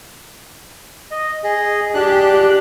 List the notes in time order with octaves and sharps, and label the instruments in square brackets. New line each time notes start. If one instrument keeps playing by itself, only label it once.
[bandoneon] D#5
G#4 D#5
[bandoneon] D4 F#6 [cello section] G4